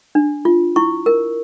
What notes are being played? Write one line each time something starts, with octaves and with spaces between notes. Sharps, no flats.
D4
F4
E4 C#6
A#4